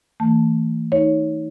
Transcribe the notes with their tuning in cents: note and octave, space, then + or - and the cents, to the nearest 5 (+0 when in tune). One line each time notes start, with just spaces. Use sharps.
E3 -20 A3 +40 A5 +0
D#4 +20 C#5 +0